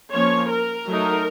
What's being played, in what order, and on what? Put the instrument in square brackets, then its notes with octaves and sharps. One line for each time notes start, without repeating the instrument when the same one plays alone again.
[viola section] F3 A#3 C#4 C#5
A#4
F#3 A3 D#4